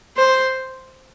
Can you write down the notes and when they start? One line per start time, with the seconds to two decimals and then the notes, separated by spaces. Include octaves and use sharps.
0.17 C5